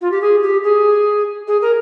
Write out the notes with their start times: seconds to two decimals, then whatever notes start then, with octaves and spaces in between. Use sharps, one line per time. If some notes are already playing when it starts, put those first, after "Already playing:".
0.01 F4
0.11 G4
0.21 G#4
0.42 G4
0.63 G#4
1.47 G#4
1.61 A#4